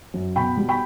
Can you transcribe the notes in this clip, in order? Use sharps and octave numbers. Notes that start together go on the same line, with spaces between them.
F#2
B2 G5 B5
G3
G5 B5